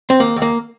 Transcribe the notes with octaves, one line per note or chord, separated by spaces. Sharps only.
C4
D#2 A#3
D#2
A#3